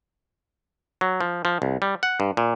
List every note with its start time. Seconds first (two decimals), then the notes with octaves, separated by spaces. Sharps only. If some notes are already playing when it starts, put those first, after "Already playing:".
1.01 F#3
1.21 F3
1.45 F3
1.62 C2
1.82 G3
2.03 F#5
2.20 G2
2.37 A#2